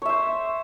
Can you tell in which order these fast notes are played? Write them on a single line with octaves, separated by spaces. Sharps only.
C#5 E5 C5